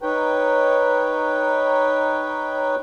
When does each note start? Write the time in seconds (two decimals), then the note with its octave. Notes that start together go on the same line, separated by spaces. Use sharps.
0.02 D#4 B4 C#5 G5